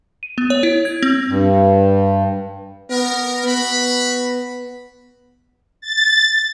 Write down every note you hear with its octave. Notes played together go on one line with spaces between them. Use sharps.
D#7
B3
C#5
E4
G#6
C4
G2
B3 A#4
B3 F#4 B5
A6